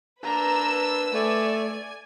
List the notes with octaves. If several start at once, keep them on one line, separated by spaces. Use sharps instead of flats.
A#3 D4 B4 A#5 E6
A3 D5 G#5